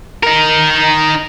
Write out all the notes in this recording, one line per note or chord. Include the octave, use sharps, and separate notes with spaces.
D#4 A#4